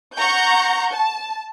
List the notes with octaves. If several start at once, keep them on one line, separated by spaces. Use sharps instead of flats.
F#5 A#5 C#6 G6
A5